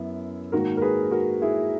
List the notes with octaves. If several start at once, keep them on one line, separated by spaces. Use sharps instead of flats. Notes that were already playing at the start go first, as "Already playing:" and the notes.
Already playing: F#2 B3 E4
G#2 D#3 A#3 F#4 A#4
A#4
G#4 B4
F#4 A#4
E4 G#4